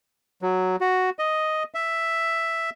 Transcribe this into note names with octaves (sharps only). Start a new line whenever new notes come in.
F#3
F#4
D#5
E5